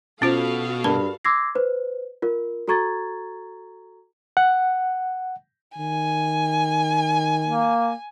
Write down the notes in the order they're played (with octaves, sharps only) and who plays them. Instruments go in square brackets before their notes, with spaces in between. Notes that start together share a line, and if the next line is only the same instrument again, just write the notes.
[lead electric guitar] B2 [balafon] C#4 F4 C5 [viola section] F#4 A4 F5
[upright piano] G2 [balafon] A#4 A5
[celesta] C6 D6 E6 G#6 A#6 C7
B4 C5
F4 A#4
F#4 A4 A#5 C#6 G#6 A6
[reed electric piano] F#5
[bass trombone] D#3 [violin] G#5
[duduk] A#3